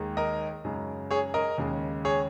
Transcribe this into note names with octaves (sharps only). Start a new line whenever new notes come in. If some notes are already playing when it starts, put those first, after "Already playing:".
Already playing: D#2 D#3 G#3
A#4 D#5
F#2 C#3 G#3
G#4 C#5
A#4 D#5
D#2 C#3 G#3
G#4 C#5